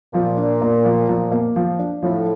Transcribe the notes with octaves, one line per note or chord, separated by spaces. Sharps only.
A#2 F3
D4
A#3
F3
F3
A#3
F3
D4
A2 F3